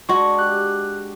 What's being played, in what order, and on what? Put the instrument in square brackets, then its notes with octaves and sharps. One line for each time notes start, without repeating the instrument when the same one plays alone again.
[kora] G#3 F#4 [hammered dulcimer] D4 [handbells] C#6
[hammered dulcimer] G4 [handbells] F#6